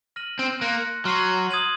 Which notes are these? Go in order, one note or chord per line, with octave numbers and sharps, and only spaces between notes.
F6 A#6 D#7 F#7
C4
A#3 C6 F#6 A#6 C#7
F#3 C6 F6 C7 D#7 F#7
D#6 G#6 D#7 F#7